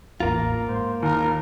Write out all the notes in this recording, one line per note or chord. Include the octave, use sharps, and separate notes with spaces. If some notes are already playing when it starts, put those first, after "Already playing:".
A1 E2 A#3 F4 A#5
G#2 C5
D#2 D#3 A#4